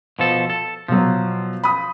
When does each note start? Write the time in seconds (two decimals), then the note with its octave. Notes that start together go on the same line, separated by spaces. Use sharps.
0.19 B2 F3 A4
0.50 A4
0.88 B2 F3 F#3
1.64 B5 D#6